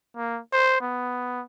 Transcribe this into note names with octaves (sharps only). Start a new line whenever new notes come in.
A#3
C5
B3